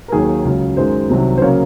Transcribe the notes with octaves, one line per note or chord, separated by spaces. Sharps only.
A#4
D#2 D#3 F#3 A#3 G#4
C#2 C#3 F#3
F#2 D#3 G#3 C5
C2 C3 D#3 F#3
C5
C#3 F#3 A#3 C#5